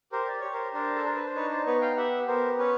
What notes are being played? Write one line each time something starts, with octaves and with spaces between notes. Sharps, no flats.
G4 A#4 C5
D5
G4 C#5
A#4 C5
D4 A#4 C5
A4
D4 A#4
B4
C5
D#4 B4 C#5
C5 D5
B3 B4 C#5
F5 G5
G4 E5 F#5
B3 A#4 C5
C#4 B4 C#5